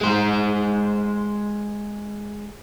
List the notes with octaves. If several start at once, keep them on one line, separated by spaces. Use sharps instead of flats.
G#3 C5